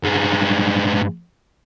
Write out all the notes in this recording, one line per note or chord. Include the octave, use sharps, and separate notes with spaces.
G2 G#3